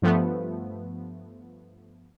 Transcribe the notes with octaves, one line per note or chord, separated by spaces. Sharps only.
G2 F3 A3 B3